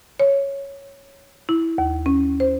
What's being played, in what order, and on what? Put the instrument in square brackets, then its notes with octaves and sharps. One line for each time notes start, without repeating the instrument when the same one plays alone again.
[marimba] C#5
E4
D#2
C#4
C5